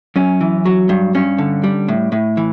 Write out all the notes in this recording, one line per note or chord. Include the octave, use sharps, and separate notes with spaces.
F#2 C#4
E3
F#3
G2
G2 C#4
D3
G3
A2
A2
E3